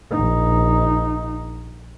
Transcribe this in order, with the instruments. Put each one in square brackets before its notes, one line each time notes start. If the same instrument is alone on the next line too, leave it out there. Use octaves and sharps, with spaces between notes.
[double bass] A#1 D#4